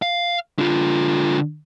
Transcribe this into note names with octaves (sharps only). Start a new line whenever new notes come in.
F5
D3 F4